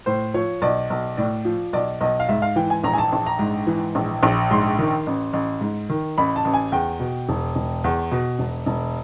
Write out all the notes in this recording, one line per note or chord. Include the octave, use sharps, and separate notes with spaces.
A2 C5
F3 C#5
B1 D5
B1
A2 D5
F3
B1 D5
B1 D#5
F5
G#2 E5
F5
E3 G5
G#5
A#1 A#5
G#5
A5
A#1 A5
A#5
G#2
E3
A#1
A#1
G#2 C6
D#3
A1
A1
G#2
D#3
A1 B5
A5
A1
G#5
E2 G5
B2
E1
E1
E2
B2
E1
E1